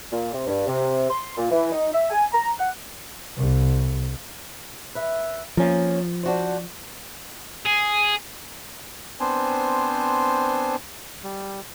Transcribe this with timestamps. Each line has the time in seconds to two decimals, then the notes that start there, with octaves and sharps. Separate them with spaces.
0.12 A#2
0.33 C3
0.47 G2
0.67 C3
1.10 C6
1.37 A#2
1.51 E3
1.72 D#4
1.93 E5
2.10 G#5
2.33 A#5
2.59 F#5
3.37 C2
4.95 B4 E5
5.57 F3 A#3 C#4 A#4
6.23 D4 F#4 C5
7.66 G#4
9.20 B3 C4 D4 C5 G#5
11.24 G3